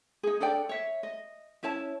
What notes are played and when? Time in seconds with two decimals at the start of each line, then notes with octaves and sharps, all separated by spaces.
0.23 D#4 G#4
0.40 D4 A4 D5 G5
0.69 C#5 E5
1.03 D#5
1.63 C#4 E4 C#5 A5